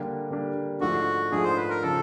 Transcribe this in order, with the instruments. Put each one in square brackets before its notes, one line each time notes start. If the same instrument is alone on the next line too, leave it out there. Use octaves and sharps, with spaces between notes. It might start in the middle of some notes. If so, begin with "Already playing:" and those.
Already playing: [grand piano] D3 G3 A#3 D4 G4
D3 G3 A#3 D4 G4
[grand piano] G#2 F3 A3 D4 [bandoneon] F#4
[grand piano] G#2 F3 A3 D4 [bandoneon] G#4
[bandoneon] C5
B4
A#4
[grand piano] C#3 F3 [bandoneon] A4